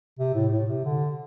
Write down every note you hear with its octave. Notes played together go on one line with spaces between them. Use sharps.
C3
A2
A2
C3
D3